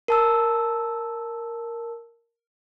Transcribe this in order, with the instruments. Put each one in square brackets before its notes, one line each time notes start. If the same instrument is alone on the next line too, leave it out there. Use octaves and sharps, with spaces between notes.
[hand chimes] A#4 A5 E6